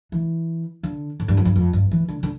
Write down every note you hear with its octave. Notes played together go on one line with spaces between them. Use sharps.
E3
D3
A2
G2
F2
G2
F2
G2
E3
D3
D3